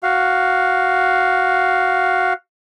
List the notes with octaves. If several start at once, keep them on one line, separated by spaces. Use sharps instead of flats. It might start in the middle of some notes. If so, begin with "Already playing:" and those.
F#4 F5